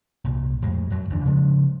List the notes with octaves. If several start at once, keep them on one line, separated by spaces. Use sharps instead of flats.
C2 A#2
F2 A2 G#3
F#2 F#3
D2 E3 D4
C#3 F3 G#3 D4